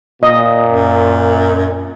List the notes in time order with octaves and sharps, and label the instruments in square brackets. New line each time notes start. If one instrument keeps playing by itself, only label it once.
[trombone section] A#2 [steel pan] D#5
[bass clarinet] F#2